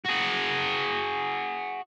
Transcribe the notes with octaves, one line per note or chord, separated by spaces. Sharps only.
F#4 G#4